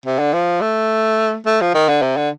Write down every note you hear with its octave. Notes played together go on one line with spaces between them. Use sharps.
C3
D3
F3
A3
A3
F3
D#3
D3
C3
D3